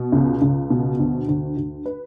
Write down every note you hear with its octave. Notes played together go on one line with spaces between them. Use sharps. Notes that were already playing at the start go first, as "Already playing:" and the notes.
Already playing: B2
C#2
C#2
B2
D2
D2
D2
B4